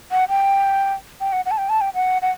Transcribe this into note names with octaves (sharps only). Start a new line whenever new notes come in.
F#5
G5
G5
F#5
F#5
A5
G5
A5
G5
F#5
F#5